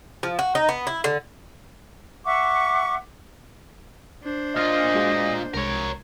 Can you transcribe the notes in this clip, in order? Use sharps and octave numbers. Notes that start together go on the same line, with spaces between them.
F3
F#4
D#4
B3
E4
D3
E5 F#5 C#6 D6
D4 C5
A#2 F4 D#5 F6
G#3 F#4 G#4
C2 G#3 A#4 C#5 G#6